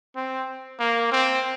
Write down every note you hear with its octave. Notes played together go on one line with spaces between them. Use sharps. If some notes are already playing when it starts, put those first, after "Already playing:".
C4
A#3
C4